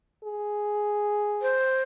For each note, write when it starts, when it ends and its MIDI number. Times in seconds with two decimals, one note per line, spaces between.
0.24 1.62 68
1.42 1.82 72